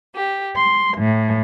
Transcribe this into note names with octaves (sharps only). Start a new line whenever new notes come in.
G4
C6
A2